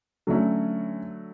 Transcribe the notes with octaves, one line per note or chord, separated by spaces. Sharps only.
D3 F#3 A3 C#4